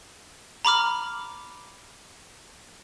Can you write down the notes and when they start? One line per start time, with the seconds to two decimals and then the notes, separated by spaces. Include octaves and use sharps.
0.65 A#5 B5 D6 F6